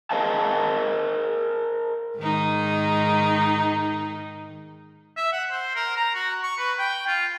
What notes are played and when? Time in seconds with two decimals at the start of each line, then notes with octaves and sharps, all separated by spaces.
0.11 G#4 A#4 C5 D#5 F5 A5
2.18 G#2 D#3 D#4
5.17 E5
5.33 F#5
5.51 C5
5.76 A#4
5.96 A#5
6.15 F#4
6.43 C#6
6.58 B4
6.79 G5
7.07 F4